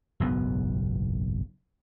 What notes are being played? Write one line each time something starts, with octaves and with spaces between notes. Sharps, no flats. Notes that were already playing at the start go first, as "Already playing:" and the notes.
F#1 B1 G#2 B3